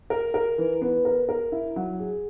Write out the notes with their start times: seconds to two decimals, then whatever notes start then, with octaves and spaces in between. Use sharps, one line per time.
0.10 A#4
0.34 A#4
0.58 E3
0.81 B3
1.05 A#4
1.29 A#4
1.52 E4
1.76 F#3
1.99 G#4